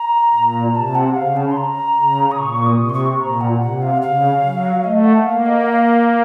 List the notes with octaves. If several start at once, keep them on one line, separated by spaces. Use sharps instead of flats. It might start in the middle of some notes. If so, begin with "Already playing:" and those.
Already playing: A#5
A#2
C3 A5
F#5
C#3 F5
A5
C6
A#5
C#3
D#6
A#2 C#6
D#6
C3
C6
C#6
A#2 A#5
F#5
C3 F#5
F5
C#3 F5
F#3
A3 D#5
F#5
A#3 F5
D#5
F#5
F5